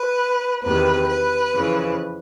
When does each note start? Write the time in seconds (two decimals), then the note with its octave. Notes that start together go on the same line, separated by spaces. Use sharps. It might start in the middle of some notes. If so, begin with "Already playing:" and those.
Already playing: B4
0.63 E2 C3 D#3 B4
1.09 B4
1.54 F2 C#3 E3